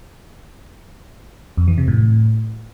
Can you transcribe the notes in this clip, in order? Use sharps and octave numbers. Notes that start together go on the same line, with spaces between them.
F2
E3
C3
A2